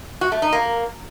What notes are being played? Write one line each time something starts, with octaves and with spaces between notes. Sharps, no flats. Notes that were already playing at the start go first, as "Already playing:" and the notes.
F#4
A3
D#4
A#3